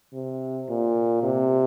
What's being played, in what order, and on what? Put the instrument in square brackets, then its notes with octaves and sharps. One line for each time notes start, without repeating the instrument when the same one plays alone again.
[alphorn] C3
A#2
C3